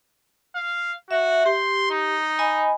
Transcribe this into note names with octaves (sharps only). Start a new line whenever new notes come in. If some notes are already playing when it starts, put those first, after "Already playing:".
F5
F#4 E5
G4 C6
D#4
D#5 G#5 B5